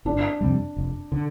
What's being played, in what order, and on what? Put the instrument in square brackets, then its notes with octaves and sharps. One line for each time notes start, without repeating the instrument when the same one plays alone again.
[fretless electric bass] G1 [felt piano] D4
[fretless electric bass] F2 C3 G3
F1
D3